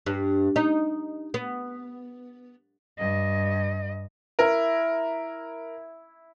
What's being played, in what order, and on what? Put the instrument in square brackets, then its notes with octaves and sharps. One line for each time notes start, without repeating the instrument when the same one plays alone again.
[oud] G2
D#4
B3
[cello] G2 D#5
[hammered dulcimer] E4 [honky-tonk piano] A#4